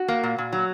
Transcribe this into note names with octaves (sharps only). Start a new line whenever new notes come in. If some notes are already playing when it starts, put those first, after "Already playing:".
Already playing: F#4
A#3
A#2
A#2
F#3